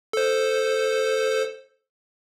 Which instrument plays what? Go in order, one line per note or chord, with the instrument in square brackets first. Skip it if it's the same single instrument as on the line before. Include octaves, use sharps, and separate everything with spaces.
[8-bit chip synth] A4 C5